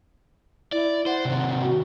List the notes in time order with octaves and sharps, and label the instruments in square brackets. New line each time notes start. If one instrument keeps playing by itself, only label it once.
[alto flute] E4 [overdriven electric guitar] D5
[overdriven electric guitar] C5 [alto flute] F#5
[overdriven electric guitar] C3 D#3
[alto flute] F#4